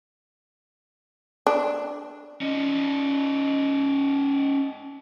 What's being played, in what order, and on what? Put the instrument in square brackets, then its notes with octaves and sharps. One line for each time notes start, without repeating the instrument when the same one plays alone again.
[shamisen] D4
[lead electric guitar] C#4 D#4